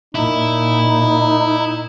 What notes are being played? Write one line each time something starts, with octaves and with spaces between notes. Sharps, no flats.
A#2 D#4 E4